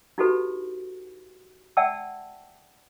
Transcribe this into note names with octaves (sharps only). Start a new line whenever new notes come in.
D#4 E4 F#4 G4 A4 B4
D5 E5 F#5 G5 A5 E6